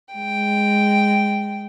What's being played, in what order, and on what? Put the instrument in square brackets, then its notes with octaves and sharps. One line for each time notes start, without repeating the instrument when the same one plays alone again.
[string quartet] G#3 G5